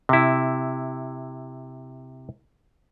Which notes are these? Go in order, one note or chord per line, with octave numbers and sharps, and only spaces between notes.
C3 E4